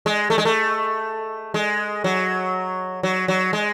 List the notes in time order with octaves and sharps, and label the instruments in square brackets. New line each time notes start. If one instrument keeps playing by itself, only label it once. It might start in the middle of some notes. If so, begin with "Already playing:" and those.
[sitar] G#3
A3
G#3
A3
G#3
F#3
F#3
F#3
G#3